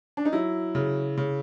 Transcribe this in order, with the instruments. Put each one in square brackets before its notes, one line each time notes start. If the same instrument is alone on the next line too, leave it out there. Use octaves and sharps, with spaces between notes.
[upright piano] D4
D#4
[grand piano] F#3 [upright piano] E4
[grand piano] C#3
C#3